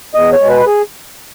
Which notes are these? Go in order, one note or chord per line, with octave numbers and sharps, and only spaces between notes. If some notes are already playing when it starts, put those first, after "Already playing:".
E2 D#5
C#5
B2 G#3
B4
G#4